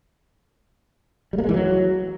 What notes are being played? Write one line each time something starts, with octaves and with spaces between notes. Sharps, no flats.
G3
A#3
G#3
E3
F#3